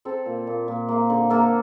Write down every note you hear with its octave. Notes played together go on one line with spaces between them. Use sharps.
C4 A4
A#2
A#2
A#2
A#3
D3
A#3 A4